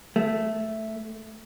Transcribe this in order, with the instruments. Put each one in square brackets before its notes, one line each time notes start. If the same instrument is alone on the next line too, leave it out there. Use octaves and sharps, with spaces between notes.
[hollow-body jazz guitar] A3